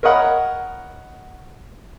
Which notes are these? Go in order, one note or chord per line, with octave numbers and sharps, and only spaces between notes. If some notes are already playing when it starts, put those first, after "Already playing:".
A#4 C#5 D#5 F#5 A#5 B5